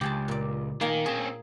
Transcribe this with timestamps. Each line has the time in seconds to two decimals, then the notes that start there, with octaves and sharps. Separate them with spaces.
0.01 C#2 G4 G#4 A5
0.28 A#2 D5
0.81 D#3 A#3 G#5
1.06 C4 C#4 G#4